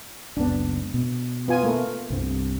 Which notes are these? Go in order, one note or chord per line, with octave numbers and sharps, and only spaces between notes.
F#1 C#2 B3 D4
B2
B3 F4 G#5
A3 A#3
C2 G2 C4